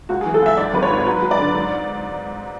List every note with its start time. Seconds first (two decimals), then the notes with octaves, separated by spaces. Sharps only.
0.09 C#2 F#4
0.21 G#4
0.26 E3
0.34 A4
0.42 C#2 E5
0.57 G#2 D5
0.73 G#1 B4
0.83 C#5
0.90 G#2
1.06 F#3 B4
1.22 F#3
1.31 D5
1.39 D3
1.55 G#2